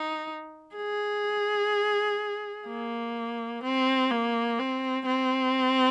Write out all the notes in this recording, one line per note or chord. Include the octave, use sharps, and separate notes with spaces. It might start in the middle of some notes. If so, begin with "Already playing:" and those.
Already playing: D#4
G#4
A#3
C4
A#3
C4
C4